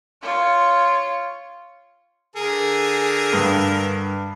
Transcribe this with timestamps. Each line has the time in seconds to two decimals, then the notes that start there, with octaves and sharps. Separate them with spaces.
0.22 F4 C#5
2.36 D3 G#4 A#4
3.33 G2 B4 D#6